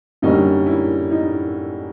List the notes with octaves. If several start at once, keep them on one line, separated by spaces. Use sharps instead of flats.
F#2 D3 G3 A#3 C#4 D#4
E4
D#4